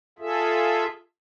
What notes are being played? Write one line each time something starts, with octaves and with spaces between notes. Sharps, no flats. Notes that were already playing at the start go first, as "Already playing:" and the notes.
F4 G#4 A4 E5